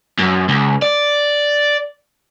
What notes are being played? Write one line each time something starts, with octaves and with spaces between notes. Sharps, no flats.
F#2
C#2
D5